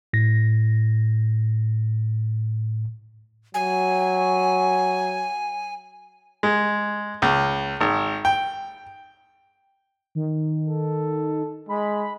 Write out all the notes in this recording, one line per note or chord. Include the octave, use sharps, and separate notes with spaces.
A2 A#6
F#3 G#5
G#3
C#2
G#1
G5
D#3
A4
G#3 B5